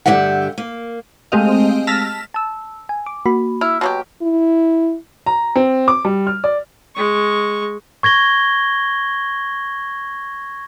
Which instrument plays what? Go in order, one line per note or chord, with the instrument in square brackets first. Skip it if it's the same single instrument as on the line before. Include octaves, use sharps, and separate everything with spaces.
[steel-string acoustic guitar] G2 D3 G#3 G4 E5 F#5
A#3
[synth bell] G#3 A3 C4 G4 D#5 F5
A5 E6 F6 A#6 B6
[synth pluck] A5 E6
G#5
D6
A#3 F#4 B5
[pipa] E4 [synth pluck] F6
[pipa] B2 F#3 G4
[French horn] E4
[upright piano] A#5
C4
D6
G3
F6
D5
[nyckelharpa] G#3 C#6
[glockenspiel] C#6 G#6 A#6 G7